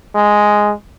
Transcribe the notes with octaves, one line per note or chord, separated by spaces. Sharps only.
G#3